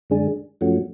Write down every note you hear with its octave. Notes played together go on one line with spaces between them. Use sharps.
F#2 D3 G#3 D4 G#4
F#2 F3 A3 C#4 F#4